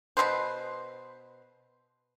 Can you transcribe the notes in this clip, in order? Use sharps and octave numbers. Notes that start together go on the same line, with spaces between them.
B2 G#3 B4 C5